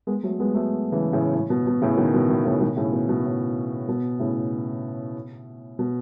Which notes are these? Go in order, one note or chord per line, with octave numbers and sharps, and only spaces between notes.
G#3 B3
F#3 A3
G#3 B3
F#3 A3
C#3 E3
A2 C#3
A2
B2
B2
A2 C#3
B2 D#3
B2
B2
A2 C#3
B2 D#3
A2 C#3
B2
B2
A2
B2
A2 C#3
B2